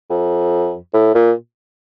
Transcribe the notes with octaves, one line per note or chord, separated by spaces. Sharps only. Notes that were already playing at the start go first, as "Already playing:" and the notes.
F2
A2
A#2